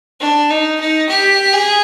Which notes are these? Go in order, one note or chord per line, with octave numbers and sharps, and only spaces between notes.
D4
D#4
D#4
G4
G#4